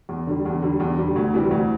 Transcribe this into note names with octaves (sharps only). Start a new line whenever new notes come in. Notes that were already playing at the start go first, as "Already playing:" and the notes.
E2
D3 G3
E2
D3 G3
E2
D3 G3
D2
C3 E3 G3
D2